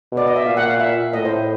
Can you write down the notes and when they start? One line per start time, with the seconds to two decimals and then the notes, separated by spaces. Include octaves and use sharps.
0.12 B2
0.17 D5
0.27 D#5
0.36 E5
0.46 A#2 F5
0.57 F#5
0.68 F5
0.79 E5
1.13 A2 D#5
1.25 C5